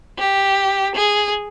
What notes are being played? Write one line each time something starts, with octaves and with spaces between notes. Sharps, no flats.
G4
G#4